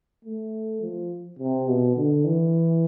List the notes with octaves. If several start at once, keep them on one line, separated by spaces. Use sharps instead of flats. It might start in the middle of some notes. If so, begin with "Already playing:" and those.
A3
F3
C3
B2
D3
E3